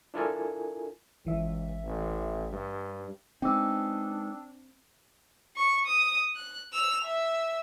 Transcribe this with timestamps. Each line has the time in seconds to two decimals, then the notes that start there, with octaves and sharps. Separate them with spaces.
0.14 D4 E4 F4 A4 A#4 G#5
1.25 G#1 C#2 E3 E5
1.84 A1
2.52 G2
3.42 G#3 B3 C4 D4 D#4 G5 D6 E6
5.56 C#6
5.86 D#6
6.35 F#6
6.73 E6 F7
7.05 E5